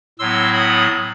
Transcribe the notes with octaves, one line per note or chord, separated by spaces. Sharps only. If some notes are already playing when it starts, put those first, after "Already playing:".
A2 F#3 B3 C6 E6
B5 D#6